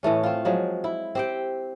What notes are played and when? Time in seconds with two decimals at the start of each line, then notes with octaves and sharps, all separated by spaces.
0.03 A2 E3 A3 C#4
0.23 C4 F4
0.45 F3 F#3 G#3
0.84 E4
1.15 C4 G4 G5